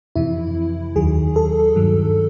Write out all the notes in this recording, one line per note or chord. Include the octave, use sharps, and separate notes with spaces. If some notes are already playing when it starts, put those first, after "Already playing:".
F2 C3 E3 E4
D#2 D#3 F#3 G#4
A4
G2 D#3 F#3